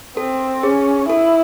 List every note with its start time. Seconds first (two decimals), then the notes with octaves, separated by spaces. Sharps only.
0.17 C4 A4
0.63 C#4 G#4
1.09 E4 A4